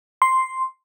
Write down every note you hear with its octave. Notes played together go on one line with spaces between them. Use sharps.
C6